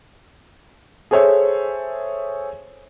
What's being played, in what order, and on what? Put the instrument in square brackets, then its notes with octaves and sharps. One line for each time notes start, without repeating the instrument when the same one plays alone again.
[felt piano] G#4 A4 C5 C#5 E5